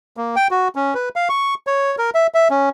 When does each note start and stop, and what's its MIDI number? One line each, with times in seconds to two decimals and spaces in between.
0.17 0.36 58
0.36 0.48 79
0.51 0.68 66
0.76 0.94 61
0.94 1.09 71
1.16 1.28 77
1.29 1.54 85
1.67 1.96 73
1.98 2.10 70
2.15 2.27 76
2.34 2.48 76
2.50 2.69 61